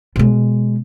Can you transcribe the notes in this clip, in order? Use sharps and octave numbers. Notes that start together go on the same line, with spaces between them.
B2 G#3